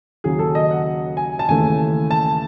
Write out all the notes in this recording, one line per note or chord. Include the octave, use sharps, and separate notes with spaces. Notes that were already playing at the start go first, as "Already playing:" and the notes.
D#2 C#3 F#3 G#4
A4
D#5
F#5
G#5
A5
D#2 C#3 E3 A3 G#5
A5